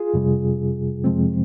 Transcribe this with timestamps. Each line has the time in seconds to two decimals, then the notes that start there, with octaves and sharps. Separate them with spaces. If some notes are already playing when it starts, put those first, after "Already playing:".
Already playing: F4 G#4
0.14 F2 C3 G3
1.04 F2 C3 F3 G#3 C4